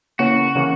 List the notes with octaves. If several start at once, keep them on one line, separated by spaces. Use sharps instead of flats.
C#3 E3 A#3 C#4 F#4
C#3 E3 A#3 C#4